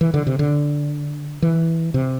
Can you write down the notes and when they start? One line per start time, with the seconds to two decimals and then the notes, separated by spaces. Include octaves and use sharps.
0.01 E3
0.14 D3
0.27 C3
0.39 D3
1.42 E3
1.94 C3